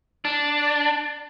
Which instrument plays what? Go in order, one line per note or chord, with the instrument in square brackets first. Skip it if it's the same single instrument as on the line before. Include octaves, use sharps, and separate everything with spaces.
[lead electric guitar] D4